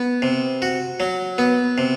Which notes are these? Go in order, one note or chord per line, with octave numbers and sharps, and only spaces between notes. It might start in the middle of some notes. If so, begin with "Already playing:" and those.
Already playing: B3
C3
F#4
F#3
B3
C3